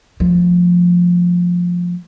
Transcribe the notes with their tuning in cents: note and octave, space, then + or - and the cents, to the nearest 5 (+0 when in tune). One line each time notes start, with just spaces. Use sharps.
F3 +15 A3 +0